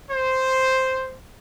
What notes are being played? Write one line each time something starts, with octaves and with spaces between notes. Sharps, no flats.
C5